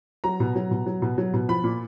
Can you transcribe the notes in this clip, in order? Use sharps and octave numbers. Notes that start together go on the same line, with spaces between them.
F#3 A#5
B2
F#3
B2
F#3
B2
F#3
B2
F3 B5
A#2